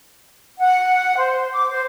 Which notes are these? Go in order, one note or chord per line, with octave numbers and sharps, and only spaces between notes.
F#5
C5
D6
C5